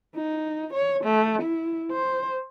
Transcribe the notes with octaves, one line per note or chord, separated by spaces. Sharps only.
D#4
C#5
A3
E4
C5